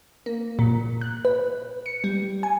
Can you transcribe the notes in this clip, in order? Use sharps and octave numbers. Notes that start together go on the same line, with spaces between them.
A#3
A#2
F#6
B4
C#7
G3
G#5